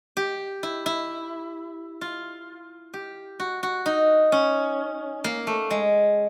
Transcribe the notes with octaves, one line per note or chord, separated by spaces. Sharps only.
G4
E4
E4
F4
G4
F#4
F#4
D#4
C#4
A#3
A3
G#3